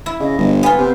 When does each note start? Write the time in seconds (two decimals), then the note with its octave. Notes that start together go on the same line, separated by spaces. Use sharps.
0.06 E4
0.20 C#3 D#5
0.39 G1
0.63 B3 F4 G#5
0.78 C3 C5